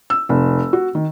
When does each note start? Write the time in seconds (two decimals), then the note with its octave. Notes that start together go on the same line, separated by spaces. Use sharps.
0.10 E6
0.29 F1
0.73 F#4
0.95 D#3